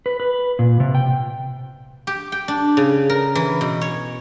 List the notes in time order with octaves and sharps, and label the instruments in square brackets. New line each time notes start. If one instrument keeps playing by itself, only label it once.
[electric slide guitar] B4
B4
A#2
C3
G5
[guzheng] G4
G5
D4
C#3
A#4
E3
B2
C#5